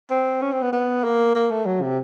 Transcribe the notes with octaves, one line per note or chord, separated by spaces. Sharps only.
C4
C#4
C4
B3
B3
A#3
A#3
A3
F#3
C3